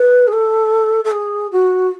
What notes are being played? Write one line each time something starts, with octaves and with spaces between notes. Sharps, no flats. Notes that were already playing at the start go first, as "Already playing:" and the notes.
Already playing: B4
G#4
A4
A4
G#4
F#4